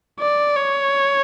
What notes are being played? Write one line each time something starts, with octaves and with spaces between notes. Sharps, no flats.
D5
C#5